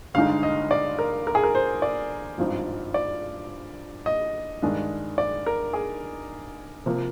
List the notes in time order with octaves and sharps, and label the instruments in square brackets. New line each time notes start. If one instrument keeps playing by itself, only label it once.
[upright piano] G1 G2 D3 G#3 D#4 F5
D#5
D5
A#4
A#4
G#4
A#4
C5
D5
G#1 G2 F3 C4 D#4
D5
D#5
G2 D#3 G#3 D4
D5
A#4
G#4
C3 F3 A#3